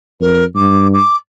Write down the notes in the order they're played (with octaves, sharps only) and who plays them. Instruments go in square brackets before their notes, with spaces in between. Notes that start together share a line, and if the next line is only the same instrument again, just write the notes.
[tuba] F2 [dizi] A#4
[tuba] G2 [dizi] D6
[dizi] D6